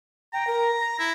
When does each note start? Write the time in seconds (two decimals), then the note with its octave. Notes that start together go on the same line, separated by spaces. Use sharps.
0.33 G5 A#5
0.47 A#4
0.80 A#6
0.99 E4